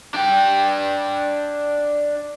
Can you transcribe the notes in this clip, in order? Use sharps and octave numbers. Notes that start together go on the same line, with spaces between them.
D4 G5